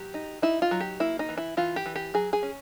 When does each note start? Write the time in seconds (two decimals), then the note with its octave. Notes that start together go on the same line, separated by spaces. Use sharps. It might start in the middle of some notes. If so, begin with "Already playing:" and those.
Already playing: F#3 G4
0.14 D#4
0.42 D#4 E4
0.62 F4
0.71 F#3
0.81 G4
1.00 A#3 E4
1.19 D#4
1.29 E3
1.38 E4
1.57 E3 F4
1.76 G4
1.86 E3
1.96 G4
2.14 F#3 G#4
2.33 G#4
2.43 C#4